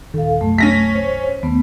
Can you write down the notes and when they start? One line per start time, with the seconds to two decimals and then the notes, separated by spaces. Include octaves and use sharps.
0.14 D#1 B1 D#3 A4 F5
0.41 C2 F#2 A3
0.58 C#4 A#6 B6
0.94 C5 C#5
1.43 D#2 A3 B3